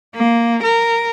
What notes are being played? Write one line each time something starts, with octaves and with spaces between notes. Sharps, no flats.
A#3
A#4